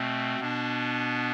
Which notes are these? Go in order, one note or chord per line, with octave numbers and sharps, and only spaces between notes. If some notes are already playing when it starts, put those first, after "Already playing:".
Already playing: B2 A3 C4
B2 B3 D4